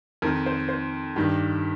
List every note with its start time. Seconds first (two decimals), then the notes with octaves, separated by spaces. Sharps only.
0.22 F2 D#3 A#4
0.46 C5
0.69 C5
1.16 G2 D#3 G4